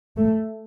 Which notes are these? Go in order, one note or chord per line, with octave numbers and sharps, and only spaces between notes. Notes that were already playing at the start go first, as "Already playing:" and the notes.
A3